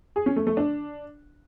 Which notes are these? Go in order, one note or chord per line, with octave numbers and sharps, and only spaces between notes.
G#4
C#4
A3
A3
D4